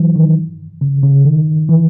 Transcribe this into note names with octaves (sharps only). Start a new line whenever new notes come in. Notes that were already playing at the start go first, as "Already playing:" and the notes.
Already playing: E3 F#3
D#3
C#3
C#3
D#3
E3